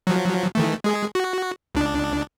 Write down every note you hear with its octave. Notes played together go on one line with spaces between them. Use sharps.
F3 F#3
D#3 E3 A3
G#3 G#4
F#4
C#2 D4